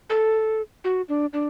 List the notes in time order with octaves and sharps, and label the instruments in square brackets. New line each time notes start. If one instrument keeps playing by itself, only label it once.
[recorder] A4
F#4
D4
D4